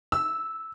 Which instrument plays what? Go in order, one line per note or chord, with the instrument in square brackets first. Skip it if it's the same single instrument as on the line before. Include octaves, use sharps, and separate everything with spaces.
[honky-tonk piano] E6